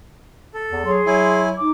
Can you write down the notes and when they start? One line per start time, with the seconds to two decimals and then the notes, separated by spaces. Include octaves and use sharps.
0.54 A4
0.71 E2
0.85 F#3 G#4 C6
1.06 F#3 E4 G#5
1.58 D#4 D6